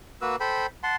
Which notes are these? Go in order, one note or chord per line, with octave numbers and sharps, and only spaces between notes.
A#3 F#4 B4 E6
A4 C5 G5 B5
F#5 A5 C6